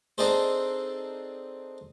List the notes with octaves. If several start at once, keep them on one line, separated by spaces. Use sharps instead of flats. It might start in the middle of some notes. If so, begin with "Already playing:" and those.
C4 D4 D#4 G#4 A4 C5